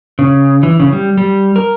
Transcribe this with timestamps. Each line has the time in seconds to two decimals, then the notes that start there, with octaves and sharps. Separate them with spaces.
0.19 C#3
0.63 E3
0.80 C#3
0.93 G3
1.17 G3
1.56 A#4